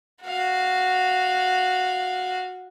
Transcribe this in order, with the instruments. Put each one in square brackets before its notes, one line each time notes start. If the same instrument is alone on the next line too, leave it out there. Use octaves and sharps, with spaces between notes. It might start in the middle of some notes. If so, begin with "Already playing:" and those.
[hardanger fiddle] F#4 F5